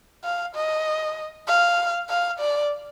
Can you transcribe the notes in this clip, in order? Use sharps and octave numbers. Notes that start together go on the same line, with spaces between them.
F5
D#5
F5
F5
D5